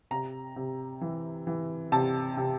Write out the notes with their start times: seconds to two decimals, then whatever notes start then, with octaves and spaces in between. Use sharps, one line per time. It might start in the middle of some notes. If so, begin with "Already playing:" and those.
0.11 C3 A#5
0.56 C3
1.01 E3
1.47 E3
1.92 C3 A5
2.37 C3